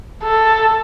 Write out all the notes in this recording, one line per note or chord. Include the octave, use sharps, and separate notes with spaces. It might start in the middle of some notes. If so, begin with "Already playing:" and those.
A4